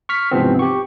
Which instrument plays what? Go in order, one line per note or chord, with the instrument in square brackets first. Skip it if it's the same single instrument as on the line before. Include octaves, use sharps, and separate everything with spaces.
[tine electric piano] C#6 F6 B6
G#2 C3 E3 F3 B3 C4
G4 C#6